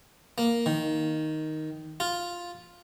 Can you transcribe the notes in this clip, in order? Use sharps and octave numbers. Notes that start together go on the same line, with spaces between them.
A#3
D#3
F4